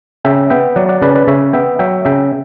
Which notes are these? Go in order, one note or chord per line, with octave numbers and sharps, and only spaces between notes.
C#3 E5 G5
B3 E5 G5
F#3 D5 F#5
D5 F#5
C#3 B4 D5
B4 D5
C#3 C#5 E5
B3 E5 G5
F#3 E5 G5
C#3 E5 G5